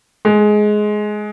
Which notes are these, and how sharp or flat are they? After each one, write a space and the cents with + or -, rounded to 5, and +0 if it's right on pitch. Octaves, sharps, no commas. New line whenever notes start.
G#3 +15